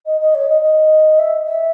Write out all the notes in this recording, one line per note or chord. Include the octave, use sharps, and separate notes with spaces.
D#5
D#5
C#5
D#5
D#5
E5
E5